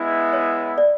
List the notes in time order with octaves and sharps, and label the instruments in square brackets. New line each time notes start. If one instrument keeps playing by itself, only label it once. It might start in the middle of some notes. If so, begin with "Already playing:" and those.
Already playing: [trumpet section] G#3 B3 E4
[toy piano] C#5
D5